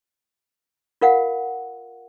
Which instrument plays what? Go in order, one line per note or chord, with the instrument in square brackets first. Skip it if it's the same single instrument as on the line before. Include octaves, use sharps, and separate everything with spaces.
[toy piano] F4 A#4 F5 F#5